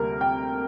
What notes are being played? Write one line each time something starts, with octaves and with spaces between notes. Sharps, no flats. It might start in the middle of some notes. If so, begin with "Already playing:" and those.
Already playing: D2 C3 G3 A#3 A#4
G5